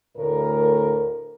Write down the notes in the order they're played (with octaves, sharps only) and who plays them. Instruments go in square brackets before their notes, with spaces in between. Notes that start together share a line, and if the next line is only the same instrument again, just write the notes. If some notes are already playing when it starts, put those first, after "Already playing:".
[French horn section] D2 A2 A#4